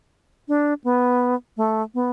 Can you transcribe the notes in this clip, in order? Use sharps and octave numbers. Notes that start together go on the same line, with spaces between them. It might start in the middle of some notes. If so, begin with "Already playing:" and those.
D4
B3
A3
B3